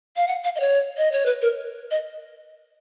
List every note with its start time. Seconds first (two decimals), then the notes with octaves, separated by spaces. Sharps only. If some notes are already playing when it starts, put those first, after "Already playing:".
0.16 F5
0.28 F#5
0.44 F5
0.55 D#5
0.60 C#5
0.97 D#5
1.12 C#5
1.26 B4
1.42 A#4
1.91 D#5